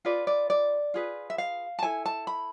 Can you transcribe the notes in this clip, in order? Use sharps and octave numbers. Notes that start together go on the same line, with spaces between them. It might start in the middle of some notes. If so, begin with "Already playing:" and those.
F4 G#4 B4 D5
D5
D5
F4 G#4 B4
E5
F5
A5
E4 A4 G#5
A5
B5